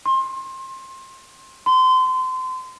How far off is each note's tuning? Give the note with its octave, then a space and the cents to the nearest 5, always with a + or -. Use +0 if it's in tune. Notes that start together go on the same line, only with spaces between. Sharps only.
C6 +25
C6 -30